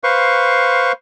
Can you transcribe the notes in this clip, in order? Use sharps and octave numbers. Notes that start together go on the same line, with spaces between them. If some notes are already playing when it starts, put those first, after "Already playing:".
B4 C5 F5 C#6